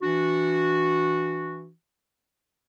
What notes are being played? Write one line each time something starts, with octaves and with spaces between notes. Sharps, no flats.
E3 D4 F#4